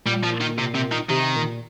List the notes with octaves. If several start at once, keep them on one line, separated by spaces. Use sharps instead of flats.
A#2 G3
F3
D#3
C3
C3
D#3
C3 D#3
A#2